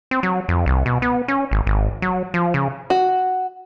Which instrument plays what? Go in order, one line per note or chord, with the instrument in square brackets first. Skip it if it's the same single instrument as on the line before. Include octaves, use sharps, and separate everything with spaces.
[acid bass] C4
F#3
F2
C2
B2
B3
C#4
G#1
G#1
F#3
F3
C#3
[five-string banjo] F#4